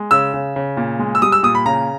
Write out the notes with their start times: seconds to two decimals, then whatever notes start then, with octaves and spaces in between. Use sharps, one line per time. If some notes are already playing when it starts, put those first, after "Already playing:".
Already playing: G#3
0.11 C#3 E6
0.34 C#3
0.56 C#3
0.77 A#2
0.99 G#3
1.15 E6
1.22 G3 D#6
1.32 E6
1.43 A#2 D#6
1.55 B5
1.66 C#3 A#5